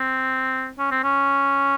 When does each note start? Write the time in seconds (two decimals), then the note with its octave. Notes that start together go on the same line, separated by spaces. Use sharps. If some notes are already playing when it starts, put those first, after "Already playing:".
Already playing: C4
0.79 C#4
0.91 C4
1.03 C#4